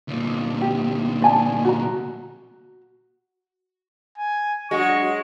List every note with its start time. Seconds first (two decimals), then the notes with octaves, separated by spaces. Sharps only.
0.08 D2 A#2
0.62 G4
1.22 D5 G#5 A5
1.65 F#4 A#5
4.18 G#5
4.71 F#3 G#3 D4 F#4 C#6